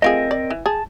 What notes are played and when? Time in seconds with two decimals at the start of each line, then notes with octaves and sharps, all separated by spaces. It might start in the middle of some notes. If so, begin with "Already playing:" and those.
0.02 A3 C4 F4 G#4 A#4 D#5
0.31 D5
0.50 E3
0.66 G#4 A5